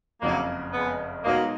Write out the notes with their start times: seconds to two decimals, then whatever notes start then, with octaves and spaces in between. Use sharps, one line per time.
0.22 F#1 F2 C#3 F#3 A#3
0.73 G#3 B3
1.24 B2 F#3 G#3 A#3 D#4 A#4